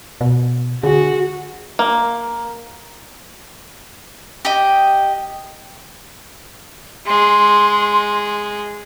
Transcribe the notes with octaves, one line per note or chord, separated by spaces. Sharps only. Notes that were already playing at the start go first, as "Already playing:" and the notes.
B2
D3 F#4 G#4
A#3
G4 D#5
G#3 C6